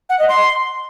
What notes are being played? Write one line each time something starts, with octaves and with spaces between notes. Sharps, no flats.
F#5
D#5
C6